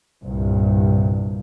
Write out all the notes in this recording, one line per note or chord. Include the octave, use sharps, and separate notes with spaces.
C2 G2 A#2